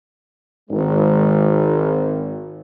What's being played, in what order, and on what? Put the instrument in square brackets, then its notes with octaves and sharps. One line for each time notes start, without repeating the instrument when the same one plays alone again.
[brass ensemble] G#1 G#3